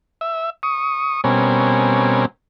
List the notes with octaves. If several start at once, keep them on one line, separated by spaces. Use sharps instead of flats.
E5
C#6 D#6
B2 G3 C4 C#4 A#4 G#5